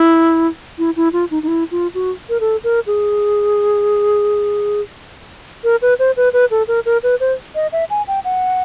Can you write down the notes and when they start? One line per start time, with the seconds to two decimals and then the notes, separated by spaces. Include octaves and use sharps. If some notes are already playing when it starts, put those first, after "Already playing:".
Already playing: E4
0.78 E4
0.96 E4
1.13 F4
1.31 D#4
1.43 D#4
1.48 E4
1.71 F4
1.94 F#4
2.29 A#4
2.40 A4
2.64 A#4
2.87 G#4
5.64 A#4
5.82 B4
5.99 C5
6.17 B4
6.33 B4
6.51 A4
6.68 A#4
6.86 A#4
7.03 B4
7.20 C5
7.55 D#5
7.72 E5
7.90 G#5
8.08 G5
8.25 F#5